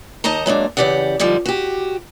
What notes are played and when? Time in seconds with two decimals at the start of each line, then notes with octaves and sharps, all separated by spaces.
0.24 D#2 D#4 D#5 A5 A#5
0.46 F#3 G#3 A#3 D4
0.77 C#3 E3 G4 D5 F#5
1.20 G#2 D3 F3 G3
1.46 F#4 G4